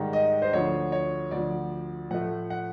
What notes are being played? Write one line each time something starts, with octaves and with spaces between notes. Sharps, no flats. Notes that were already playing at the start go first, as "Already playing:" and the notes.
Already playing: G#2 D#3 G3
D#5
C5
D2 D3 F3 C#5
C#5
D2 D3 F3 D5
A2 F3 A3 F#5
F#5